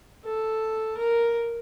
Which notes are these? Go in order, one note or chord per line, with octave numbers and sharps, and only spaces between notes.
A4
A#4